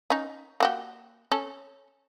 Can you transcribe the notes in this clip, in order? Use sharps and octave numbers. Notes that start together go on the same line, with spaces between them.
C#4 D#4
A#3 F#4 G4
C#4 A4